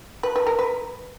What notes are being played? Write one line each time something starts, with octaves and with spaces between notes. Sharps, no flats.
B4
B4
A#4
B4